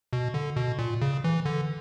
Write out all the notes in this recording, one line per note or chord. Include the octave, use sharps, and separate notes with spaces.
B2
D3
B2
A#2
C#3
E3
D3